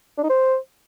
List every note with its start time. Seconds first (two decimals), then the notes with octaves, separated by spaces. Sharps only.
0.18 D4
0.24 D#4
0.30 C5